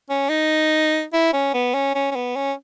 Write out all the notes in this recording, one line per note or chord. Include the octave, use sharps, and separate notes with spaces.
C#4
D#4
E4
C#4
B3
C#4
C#4
C#4
B3
C#4